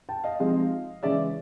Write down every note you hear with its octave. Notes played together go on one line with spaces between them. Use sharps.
G5 A5
D#5 F5
C3 F3 G#3 C4 D#4
C#3 E3 G#3 C#4 D5 E5